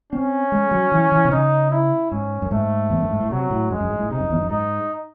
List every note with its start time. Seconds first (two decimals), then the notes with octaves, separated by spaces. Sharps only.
0.12 C4 C#4
0.52 G#3
0.71 F#3
0.92 E3
1.12 E3
1.25 C3
1.32 C#3 D#4
1.71 E4
2.11 G#2 C#4
2.42 F#2
2.51 G#2 A3
2.90 E2
3.00 F#2
3.10 G#2
3.20 A2
3.31 C3 F#3
3.50 A2
3.70 F#2 G#3
3.81 F#2
3.90 G#2
4.00 A2
4.11 C3 D#4
4.20 F#2
4.30 E2
4.41 F#2
4.50 G#2 D#4